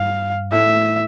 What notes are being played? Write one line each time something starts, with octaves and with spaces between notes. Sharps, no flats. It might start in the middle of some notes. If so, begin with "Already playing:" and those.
Already playing: G2 F5
A2 E5